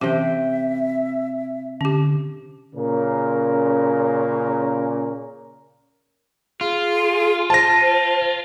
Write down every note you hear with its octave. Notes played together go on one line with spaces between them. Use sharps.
C3 E3 C#4 G4 E5 G5
D3 C#4 G4
A#2 C#3 C#4 A#4
F4 G#4
C5 A5 A#6